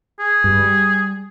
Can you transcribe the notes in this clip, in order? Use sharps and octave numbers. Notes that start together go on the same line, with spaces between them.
G#4
G2
G3